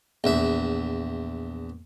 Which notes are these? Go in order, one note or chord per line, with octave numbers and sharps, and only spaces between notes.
A#1 E2 E5